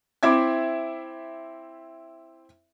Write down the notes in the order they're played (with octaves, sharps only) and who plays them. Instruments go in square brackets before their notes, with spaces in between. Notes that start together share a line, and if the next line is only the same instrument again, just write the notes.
[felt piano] C4 E4 E5 D6 G#6